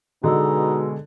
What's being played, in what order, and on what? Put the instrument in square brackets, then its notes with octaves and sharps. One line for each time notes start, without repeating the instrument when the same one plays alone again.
[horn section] B2 G#3 [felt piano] D3 [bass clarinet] D#4 [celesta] F#4 G#4 E6